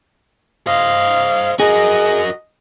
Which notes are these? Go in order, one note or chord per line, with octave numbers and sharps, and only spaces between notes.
C5 D#5 F5
F#4 G#4 A#4 D#5